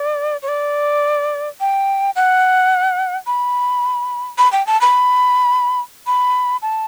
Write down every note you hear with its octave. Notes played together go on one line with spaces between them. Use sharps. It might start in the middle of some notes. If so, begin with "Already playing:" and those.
Already playing: D5
C#5
D5
G5
F#5
B5
B5
G5
A5
B5
B5
A5